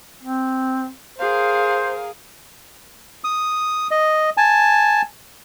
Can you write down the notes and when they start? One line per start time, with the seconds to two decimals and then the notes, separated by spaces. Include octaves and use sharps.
0.22 C4
1.18 G#4 A#4 C5 F5
3.24 D#6
3.91 D#5
4.37 G#5 A5